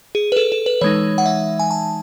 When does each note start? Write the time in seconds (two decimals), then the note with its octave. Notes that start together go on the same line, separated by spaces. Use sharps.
0.15 G#4
0.32 B4
0.37 A4
0.52 A4
0.66 B4
0.81 E3 G#3 D#4 C#5
1.18 F#5
1.26 E5
1.59 G#5
1.71 A5